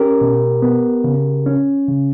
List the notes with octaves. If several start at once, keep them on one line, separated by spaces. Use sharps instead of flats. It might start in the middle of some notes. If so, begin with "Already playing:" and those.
Already playing: C#4 G4 A#4
B2
B3
C#3
C#4
C#3